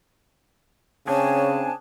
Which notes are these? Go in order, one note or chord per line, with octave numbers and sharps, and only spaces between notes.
C#3 C4 D4 G#4 C#5 G#5 A5